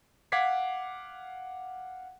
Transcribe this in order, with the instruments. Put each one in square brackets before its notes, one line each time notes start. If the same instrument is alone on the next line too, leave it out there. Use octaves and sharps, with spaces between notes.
[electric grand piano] F5 F#5 D6 G#6 B6 C7